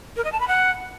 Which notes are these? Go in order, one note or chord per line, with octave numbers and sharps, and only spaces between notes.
A#4
D#5
A5
B5
F#5